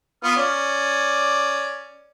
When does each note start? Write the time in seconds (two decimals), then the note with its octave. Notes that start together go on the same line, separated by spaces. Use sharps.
0.24 B3 F4 F6
0.37 C#4 D5